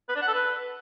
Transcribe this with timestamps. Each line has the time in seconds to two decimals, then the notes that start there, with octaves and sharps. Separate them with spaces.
0.09 B4
0.15 D4
0.22 F#5
0.28 A4
0.34 B4